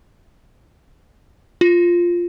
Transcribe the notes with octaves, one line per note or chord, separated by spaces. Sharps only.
F4